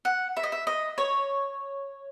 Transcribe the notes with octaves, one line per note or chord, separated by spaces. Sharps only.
F#5
E5
D#5
E5
D#5
C#5